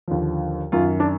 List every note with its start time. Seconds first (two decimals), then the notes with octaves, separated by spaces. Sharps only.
0.08 D#2 D3 F3
0.72 F#2 D#3 F4
1.00 D4